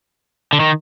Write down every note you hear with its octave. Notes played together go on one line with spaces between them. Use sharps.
D3
D#3